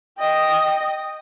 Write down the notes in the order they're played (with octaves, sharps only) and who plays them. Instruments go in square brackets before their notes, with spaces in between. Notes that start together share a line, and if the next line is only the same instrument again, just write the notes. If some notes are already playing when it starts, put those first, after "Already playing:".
[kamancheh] D#5 G5